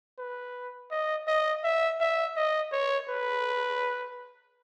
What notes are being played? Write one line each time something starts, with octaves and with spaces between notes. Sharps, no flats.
B4
D#5
D#5
E5
E5
D#5
C#5
B4